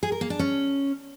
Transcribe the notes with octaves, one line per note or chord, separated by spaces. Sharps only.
G#4
A#4
A#3
D4
C#4